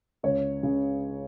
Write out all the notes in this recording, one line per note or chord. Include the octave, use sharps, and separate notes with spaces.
C#2 C#5
C#3